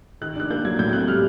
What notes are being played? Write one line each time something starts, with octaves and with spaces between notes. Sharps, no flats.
D#3 F#6
D4 F#6
A#3 G6
F#3 G#6
A2 G6
G6
C4 F#6
G3 F6